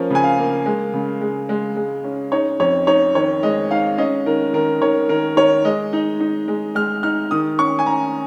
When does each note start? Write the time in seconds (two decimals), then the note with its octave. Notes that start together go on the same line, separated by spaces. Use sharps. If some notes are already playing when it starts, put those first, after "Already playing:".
Already playing: F3 A#3 C#4 A#4
0.11 C#3 G#5
0.24 F5
0.38 A#3
0.66 G#3
0.94 C#3
1.21 G#3
1.49 G#3
1.76 G#3
2.04 C#4
2.32 D#4 C#5
2.60 F2 C#5
2.87 D#4 C#5
3.15 D#3 C#5
3.43 G#3 D#5
3.71 D#4 F5
3.98 C#4 D#5
4.26 D#3 A#4
4.53 D#3 A#4
4.81 D#3 C#5
5.09 D#3 A#4
5.36 D#3 C#5
5.64 G#3 D#5
5.93 D#4
6.20 D#4
6.48 G#3
6.75 G#3 F6
7.03 D#4 F6
7.31 D#3 D#6
7.59 C#4 C#6
7.79 G#5
7.86 C#4 A#5